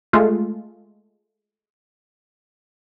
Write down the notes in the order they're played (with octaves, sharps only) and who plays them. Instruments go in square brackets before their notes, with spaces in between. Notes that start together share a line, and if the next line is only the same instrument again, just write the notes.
[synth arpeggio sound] G#3 A3 F4